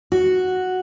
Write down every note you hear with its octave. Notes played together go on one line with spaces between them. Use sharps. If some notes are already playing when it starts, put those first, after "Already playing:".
F#4